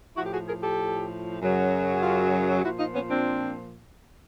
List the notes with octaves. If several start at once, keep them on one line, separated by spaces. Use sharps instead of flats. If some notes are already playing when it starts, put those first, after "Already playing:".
A2 F3 E4 F#4
G4
F#4 G#4
G#4 A#4
G4 A4
F#2 C#3 F#3
G#4
F4 G4
A#2 F3 E4 F#4
D#4 F4
B3 C#4
C4 D4